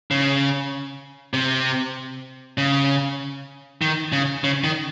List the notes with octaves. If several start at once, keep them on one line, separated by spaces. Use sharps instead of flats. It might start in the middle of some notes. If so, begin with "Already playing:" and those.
C#3
C3
C#3
D#3
C#3
C#3
D#3